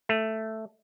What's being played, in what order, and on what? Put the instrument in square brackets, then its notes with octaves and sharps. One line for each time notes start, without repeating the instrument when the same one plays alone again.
[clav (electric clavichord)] A3